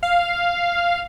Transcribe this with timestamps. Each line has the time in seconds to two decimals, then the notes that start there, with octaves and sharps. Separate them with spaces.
0.03 F5